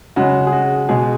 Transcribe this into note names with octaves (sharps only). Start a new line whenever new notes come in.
C#3 G#3 F#4
G#4
F#4
B2 G#3 G#4